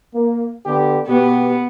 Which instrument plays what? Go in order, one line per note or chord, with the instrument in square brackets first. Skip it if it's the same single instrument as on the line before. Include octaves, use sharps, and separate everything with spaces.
[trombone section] A#3
D3 B3 G4
[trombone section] B2 G4 [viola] B3